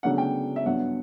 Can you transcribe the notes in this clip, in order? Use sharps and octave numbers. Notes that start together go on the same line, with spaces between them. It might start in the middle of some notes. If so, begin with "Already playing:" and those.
D2 C#3 F#3 B3 D4 F#5
G5
E5
G2 F#3 B3 D4 F#5